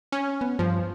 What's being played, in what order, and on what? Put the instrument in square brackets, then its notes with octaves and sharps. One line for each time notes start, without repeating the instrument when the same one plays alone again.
[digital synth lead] C#4
[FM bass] B3
[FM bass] G2 [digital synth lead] F3